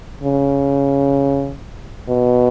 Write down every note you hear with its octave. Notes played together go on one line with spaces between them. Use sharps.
C#3
B2